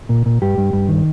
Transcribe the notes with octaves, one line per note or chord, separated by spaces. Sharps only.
A#2
A#2
G2 G4
G2
G2
D#3